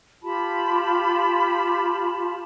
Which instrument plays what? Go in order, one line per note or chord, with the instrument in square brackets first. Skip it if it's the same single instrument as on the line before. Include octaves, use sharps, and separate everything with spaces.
[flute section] F4 G4 A5 B5